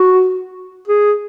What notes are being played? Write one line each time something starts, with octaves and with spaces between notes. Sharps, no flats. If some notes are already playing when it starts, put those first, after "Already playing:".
Already playing: F#4
G#4